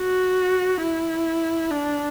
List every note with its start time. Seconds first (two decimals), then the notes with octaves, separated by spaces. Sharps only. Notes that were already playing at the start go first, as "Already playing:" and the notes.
Already playing: F#4
0.82 E4
1.70 D4